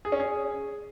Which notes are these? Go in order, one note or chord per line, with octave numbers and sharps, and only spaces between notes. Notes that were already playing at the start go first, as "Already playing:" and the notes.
G#4
C#4
G#4